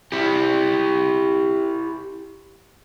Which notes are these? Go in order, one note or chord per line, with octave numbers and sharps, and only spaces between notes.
E4 G4